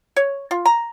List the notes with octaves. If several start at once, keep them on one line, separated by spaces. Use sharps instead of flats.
C#5
F4
A#5